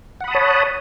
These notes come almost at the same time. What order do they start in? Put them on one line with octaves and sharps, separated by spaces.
F#5 B5 D#6 A5 C#5